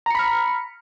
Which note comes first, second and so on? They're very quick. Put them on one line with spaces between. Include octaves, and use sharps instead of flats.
A#5 C#7 B5 F6